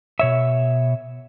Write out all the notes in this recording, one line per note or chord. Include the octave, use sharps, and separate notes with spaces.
B2 C#5 E5